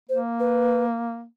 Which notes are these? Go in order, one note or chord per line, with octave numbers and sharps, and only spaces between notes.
A#3 C5
B4